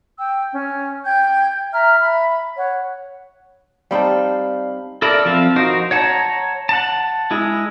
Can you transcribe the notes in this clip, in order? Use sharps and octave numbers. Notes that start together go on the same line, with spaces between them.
G5 E6
C#4
G5 G6 G#6
E5 A#5 F6
E5 B5
C#5 F#5
G3 C4 D#4 D5 F5 A5 B5
A4 A#4 D5 E5 B5
F3 C4 E5 F5
D#4 F#4 A#4 C5
C#5 F#5 A5 A#5
F#5 A5
G#3 E4 G#4